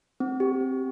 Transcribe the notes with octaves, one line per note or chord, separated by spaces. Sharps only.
C4
G4
C4